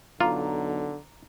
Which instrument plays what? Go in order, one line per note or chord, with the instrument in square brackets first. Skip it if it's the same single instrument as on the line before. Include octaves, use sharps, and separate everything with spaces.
[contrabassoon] B1 [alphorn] D3 [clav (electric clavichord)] F4 [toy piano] A#5 D6